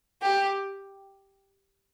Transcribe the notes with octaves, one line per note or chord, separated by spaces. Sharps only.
G4